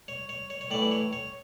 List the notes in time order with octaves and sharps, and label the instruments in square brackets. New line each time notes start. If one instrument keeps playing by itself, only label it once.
[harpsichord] C#5
C#5
C#5
C#5
A2 E3 D5
C#5
C#5